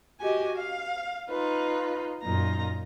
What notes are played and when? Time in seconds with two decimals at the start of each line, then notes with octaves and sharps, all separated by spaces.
0.21 F#4 G4 D#5 G#5
0.54 F5
1.30 D#4 F4 B4
2.22 F#2 A#2 D#4 F4 A#5